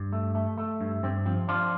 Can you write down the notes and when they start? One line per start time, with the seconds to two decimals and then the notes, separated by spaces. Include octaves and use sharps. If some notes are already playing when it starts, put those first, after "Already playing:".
Already playing: G2
0.13 A3
0.35 A3
0.58 A3
0.81 G2
1.03 G2 C4
1.26 F3 C4
1.48 F3 D4 F4